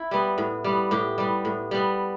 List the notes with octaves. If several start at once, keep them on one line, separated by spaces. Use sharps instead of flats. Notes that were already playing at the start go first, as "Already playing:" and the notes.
Already playing: E4
G3 B3
A2
G3 B3
A2 G4
G3 B3
A2
G3 B3